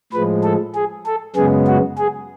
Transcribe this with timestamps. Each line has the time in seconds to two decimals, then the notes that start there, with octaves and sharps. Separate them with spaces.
0.12 A2 F3 G#3 B4
0.43 A4
0.75 G#4
1.06 A4
1.36 F#2 C#3 G#3 B3 G#4
1.67 F#4
1.98 G#4